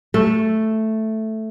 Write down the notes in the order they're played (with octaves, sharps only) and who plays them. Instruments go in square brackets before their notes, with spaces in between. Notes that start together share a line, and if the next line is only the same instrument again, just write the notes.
[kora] A3